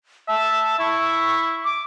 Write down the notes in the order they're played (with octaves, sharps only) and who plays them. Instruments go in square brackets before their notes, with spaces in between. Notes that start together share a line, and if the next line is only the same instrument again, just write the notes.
[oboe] E5 [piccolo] A5
[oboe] E4 [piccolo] C#6
[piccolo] D6